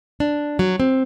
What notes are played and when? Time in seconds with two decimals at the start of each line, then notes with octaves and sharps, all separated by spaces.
0.20 D4
0.59 F#3
0.80 C4